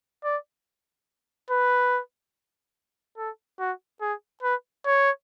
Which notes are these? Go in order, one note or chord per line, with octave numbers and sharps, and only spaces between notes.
D5
B4
A4
F#4
G#4
B4
C#5